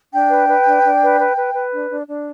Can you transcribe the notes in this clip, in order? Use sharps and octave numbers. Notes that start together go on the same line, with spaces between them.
D4 G5
B4
B4
D4
D4
B4
B4
B4
B4
D4
D4
D4